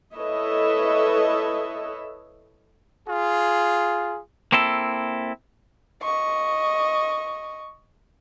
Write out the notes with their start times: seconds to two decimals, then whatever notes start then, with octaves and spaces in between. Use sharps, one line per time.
0.14 E4 A4 B4 C#5 D#5 E5
3.07 F4 G#4
4.52 A#3 C4 E4 A4
6.02 D#5 C#6